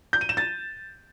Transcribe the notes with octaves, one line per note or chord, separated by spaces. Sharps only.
G6
D#7
E7
A6